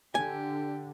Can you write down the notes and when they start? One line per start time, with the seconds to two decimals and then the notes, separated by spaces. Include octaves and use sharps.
0.15 D3 G4 G#5